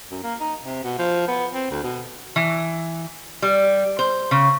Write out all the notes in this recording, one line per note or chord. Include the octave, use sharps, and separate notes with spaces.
F#2
A#3
D#4
C3
B2
F3
B3
C4
D2
B2
E3
G3
C5
C#3